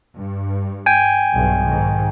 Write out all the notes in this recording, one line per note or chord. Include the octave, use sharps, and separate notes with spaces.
G2
G5 G#5
B1 G2 B2
G#2 D#3